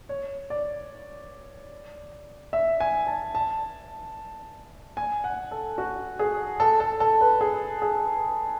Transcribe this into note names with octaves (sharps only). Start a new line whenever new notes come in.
C#5
D5
E5
G#5
A5
A5
G#5
F#5
A4
F#4
G#4
A4
A4
A4
B4
G#4
G#4